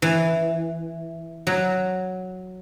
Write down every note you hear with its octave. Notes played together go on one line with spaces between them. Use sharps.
E3
F#3